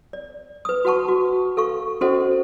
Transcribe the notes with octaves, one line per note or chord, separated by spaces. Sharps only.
D5
B4 D#6
F#4 B4 F#5 A5 C#6
F#4
A4 F5 C#6
C#4 F#4 A4 C5 D#5 F#5